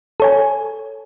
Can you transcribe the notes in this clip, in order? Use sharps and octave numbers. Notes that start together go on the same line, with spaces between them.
A4 C#5 G#5